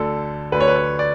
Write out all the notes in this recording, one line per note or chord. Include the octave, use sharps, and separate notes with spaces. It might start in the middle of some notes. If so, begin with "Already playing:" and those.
Already playing: D2 D3 A4
D2 D3 B4
C#5
B4
C#5
D5